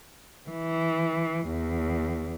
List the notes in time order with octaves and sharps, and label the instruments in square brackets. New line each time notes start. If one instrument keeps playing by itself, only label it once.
[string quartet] E3
E2